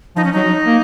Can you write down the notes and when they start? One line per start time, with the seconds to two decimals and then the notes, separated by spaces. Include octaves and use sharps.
0.16 F3 D#4
0.24 C#4
0.33 F#3 D#4
0.67 A#3